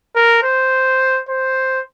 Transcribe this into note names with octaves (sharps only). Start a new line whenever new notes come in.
A#4
C5
C5